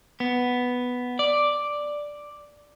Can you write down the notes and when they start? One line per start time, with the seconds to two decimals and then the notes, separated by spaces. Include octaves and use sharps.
0.20 B3
1.19 D5